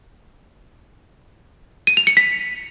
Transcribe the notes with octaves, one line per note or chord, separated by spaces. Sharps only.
D#7
F7
C#7
B6